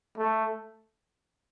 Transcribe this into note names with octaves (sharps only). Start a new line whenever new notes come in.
A3